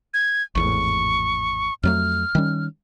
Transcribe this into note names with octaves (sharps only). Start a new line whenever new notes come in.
G#6
G#1 E2 A2 C#6
F2 F#3 A3 F6
D#3 G3 C#4